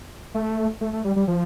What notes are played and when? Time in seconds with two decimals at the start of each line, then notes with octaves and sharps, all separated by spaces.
0.35 A3
0.81 A3
0.93 A3
1.05 G3
1.16 G3
1.28 F3